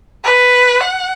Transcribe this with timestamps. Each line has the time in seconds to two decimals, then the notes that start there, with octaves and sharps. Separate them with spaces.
0.25 B4
0.80 F#5